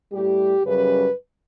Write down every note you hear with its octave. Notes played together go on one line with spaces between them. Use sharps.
A2 G3 G4
F#2 C#3 G3 B4